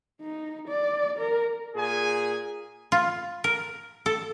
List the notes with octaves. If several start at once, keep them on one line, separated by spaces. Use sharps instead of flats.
D#4
D5
A#4
A#2 G#4 G#5
F4
A#4
A4